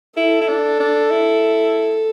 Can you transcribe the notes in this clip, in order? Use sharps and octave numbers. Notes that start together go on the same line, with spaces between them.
E4 A4
E4
D4
D4
E4